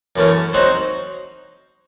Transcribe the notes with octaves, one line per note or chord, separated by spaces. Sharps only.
F#2 E3 A3 C#4
F#3 C4 D#4 F#4 C5